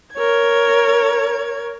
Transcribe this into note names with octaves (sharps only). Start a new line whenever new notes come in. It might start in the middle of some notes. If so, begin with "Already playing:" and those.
A#4 C#5 G#6